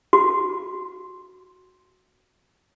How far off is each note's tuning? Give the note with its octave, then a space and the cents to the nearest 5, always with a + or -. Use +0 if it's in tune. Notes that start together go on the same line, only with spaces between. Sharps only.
F#4 +0